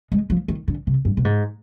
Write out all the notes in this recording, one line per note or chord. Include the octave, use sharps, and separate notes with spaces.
G#3
F3
D#3
D3
C3
G2
B2
G#2